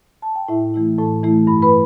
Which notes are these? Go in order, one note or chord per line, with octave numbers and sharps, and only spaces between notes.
A5
G5
A2 E4 E5
E3 A3 E4
A2 A4 A5
E3 A3 E4
G2 B5
B4 B5